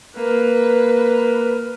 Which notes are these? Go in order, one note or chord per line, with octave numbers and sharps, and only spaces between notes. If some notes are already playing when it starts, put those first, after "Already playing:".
A#3 B4